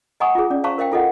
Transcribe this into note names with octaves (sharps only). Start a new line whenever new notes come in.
D#5 F#5 G#5 A#5 C#6 D#6
F4 G#4
C#4 D5
C5 F5 A5 A#5 C#6
A#4 C5 E5 F5 G5
E4 F4 A4 A#4 D#5 F#5